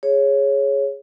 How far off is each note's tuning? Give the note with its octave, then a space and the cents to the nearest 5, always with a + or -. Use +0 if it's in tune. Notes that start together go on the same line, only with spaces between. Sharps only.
G#4 +0 C#5 -5